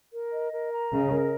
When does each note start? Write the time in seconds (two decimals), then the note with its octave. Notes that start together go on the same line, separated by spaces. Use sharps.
0.13 A#4
0.32 D#5
0.53 A#4
0.72 A#5
0.91 C#3 D#5
1.12 A#4